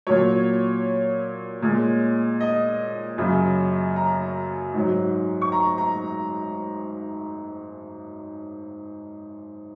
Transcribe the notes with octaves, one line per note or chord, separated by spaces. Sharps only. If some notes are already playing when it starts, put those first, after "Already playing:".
A#2 F#3 C#5
A#2 G#3
D#5
F#2 C#3 F#3
A#5
G#2 F#3
C#6
A#5
A#5